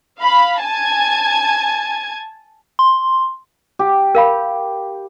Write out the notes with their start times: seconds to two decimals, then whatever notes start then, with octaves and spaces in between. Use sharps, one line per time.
0.20 F5 B5
0.62 G#5 A5 G#6
2.79 C6
3.79 G4
4.15 A#4 F5 B5